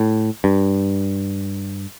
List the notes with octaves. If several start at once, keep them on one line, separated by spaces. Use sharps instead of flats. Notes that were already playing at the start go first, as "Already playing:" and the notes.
Already playing: A2
G2